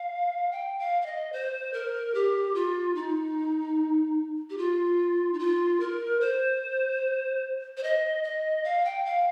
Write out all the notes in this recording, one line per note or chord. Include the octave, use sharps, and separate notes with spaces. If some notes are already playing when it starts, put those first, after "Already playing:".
Already playing: F5
G5
F5
F5
D#5
C5
A#4
G4
F4
D#4
G4
F4
D#4
F4
A#4
C5
C5
D#5
D#5
F5
G5
F5